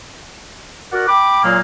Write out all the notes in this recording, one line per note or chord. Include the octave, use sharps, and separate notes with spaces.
F#4 A#4 D5 F#5
G5 B5 D6
A#2 F#3 G#3 A#3